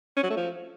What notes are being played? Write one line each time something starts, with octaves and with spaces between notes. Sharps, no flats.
C#4
F#3
A3
F3